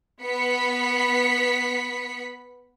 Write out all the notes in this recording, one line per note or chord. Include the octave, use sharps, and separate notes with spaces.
B3 B5 B6 C#7